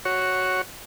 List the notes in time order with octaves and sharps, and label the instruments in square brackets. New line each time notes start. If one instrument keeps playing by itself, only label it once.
[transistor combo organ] F#4 C#5